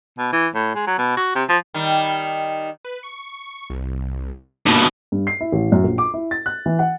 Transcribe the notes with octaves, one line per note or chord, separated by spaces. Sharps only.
B2
E3
A2
G#3
F#3
B2
F#4
C3
F3
D#3 G3
B4
C#6
C2
G2 B2 A#3 D#4
G2
C7
E4
A1
F#2
A#1
D6
E4
A6
F#6
E3
F#5